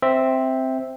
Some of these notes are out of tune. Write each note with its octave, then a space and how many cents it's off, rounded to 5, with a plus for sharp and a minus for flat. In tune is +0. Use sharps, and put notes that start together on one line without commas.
C4 +0 E5 -5